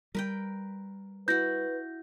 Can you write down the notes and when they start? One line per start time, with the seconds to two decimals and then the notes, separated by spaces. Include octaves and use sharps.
0.15 G3 A#4 B4 G5
1.28 E4 F#4 B4 G6 A#6